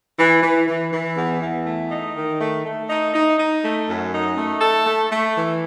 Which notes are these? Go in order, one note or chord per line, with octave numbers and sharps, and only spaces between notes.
E3
E3
E3
E3
E2
E2
A3
D#4
D#3
A3
A3
D#4
D#4
D#4
A3
F#2
D#4
A3
A4
A3
A3
E3